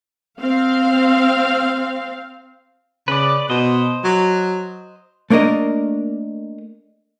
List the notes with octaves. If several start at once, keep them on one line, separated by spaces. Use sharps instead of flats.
C4 F5
C#3 B4 D5
B2 C5 D#5
F#3
A3 A#3 D4 A#4 D#5